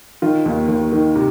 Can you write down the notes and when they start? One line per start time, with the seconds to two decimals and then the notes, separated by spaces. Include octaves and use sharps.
0.22 D#3 F4
0.46 D#2
0.68 D#2
0.92 D#3
1.15 C3